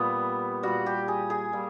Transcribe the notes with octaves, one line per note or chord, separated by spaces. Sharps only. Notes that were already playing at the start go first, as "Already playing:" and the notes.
Already playing: A#2 G3 B3
A#2 G3 F#4
G4
G#4
G#4
A#2 G3